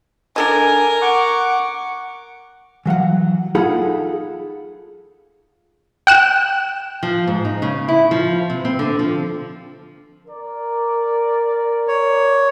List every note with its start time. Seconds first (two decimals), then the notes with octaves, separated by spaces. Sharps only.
0.36 D4 A4 A#4 D#5 G#5
1.02 F#5 C#6 D6
2.86 E3 F#3 F5 F#5
3.55 D#4 F4 G#4 A4 F#5 B5
6.07 G5 F#6 E7
7.03 F3
7.27 G#2
7.45 D#4
7.62 C#3
7.88 E4
8.11 F3
8.50 C3
8.65 C4
8.79 D3
8.99 F3
10.27 A#4 D5
11.88 C#5